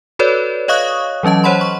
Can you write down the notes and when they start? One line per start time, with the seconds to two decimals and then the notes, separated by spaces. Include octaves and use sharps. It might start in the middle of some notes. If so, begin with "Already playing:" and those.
0.19 F#4 A4 B4 C#5 D5
0.68 C#5 D#5 F5 C#6 D#6 F#6
1.23 E3 F#3 C#4 D#5 A5
1.44 C5 C#5 F#5 B5 C6
1.61 C#6